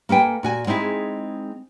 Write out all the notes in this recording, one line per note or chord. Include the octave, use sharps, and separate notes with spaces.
A#3 A4 B4 G5 G#5
A#2 F#4 G#5
G#3 C4 D#4 E4 G#4